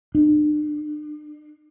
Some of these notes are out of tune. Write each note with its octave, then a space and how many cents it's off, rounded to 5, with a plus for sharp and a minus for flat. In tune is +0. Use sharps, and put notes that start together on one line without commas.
D4 +40